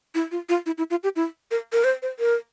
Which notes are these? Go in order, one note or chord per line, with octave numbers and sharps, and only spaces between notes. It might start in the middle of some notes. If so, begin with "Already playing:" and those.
E4
F4
F4
E4
E4
F4
G4
E4
A#4
A#4
C5
C5
A#4